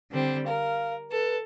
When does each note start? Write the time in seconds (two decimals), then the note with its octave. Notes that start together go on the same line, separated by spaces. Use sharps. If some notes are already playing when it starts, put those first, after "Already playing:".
0.10 D3 G3 C4
0.45 A#4 F5
1.10 A4 B4